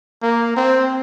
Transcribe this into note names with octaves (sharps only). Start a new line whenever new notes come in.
A#3
C4